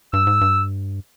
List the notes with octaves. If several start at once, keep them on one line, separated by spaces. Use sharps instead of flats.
G2 E6
G#2
G2